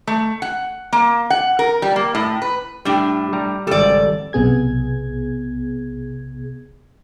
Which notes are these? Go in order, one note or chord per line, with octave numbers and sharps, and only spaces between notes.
A3
F#5
A#3
F#5
A#4
G3
A#3
A2
B4
A2 G3 D4 G4
G3 G4 A#5
G#1 C#2 G3 A4 D5
B1 C3 B3 G#4 G#6